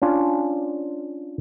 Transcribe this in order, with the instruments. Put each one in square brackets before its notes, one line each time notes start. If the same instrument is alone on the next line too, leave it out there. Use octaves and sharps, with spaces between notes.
[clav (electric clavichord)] C#4 D4 F4